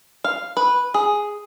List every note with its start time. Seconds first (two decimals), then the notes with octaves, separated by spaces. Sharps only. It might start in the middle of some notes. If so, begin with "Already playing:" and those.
0.24 F5
0.57 B4
0.94 G#4